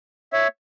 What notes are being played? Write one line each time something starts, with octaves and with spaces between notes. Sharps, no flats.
C#5 E5